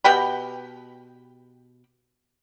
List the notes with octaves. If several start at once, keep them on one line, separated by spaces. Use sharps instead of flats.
B2 G4 G5 B5